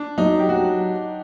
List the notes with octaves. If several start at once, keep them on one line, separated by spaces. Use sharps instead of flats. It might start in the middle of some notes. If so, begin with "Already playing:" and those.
Already playing: D4
F#3 D#4
G4
F#3 F#4